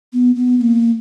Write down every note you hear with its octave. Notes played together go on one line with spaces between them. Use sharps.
B3
B3
B3
A#3